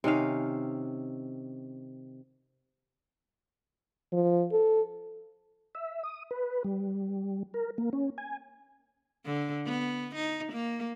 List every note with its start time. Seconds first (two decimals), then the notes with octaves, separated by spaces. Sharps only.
0.04 C3 D#3 C#4 F5
4.12 F3
4.52 A4
5.75 E5
6.03 D#6
6.31 B4
6.64 G3
7.54 A#4
7.78 A#3
7.93 C#4
8.18 G#5
9.26 D3
9.66 B3
10.16 D#4
10.53 A#3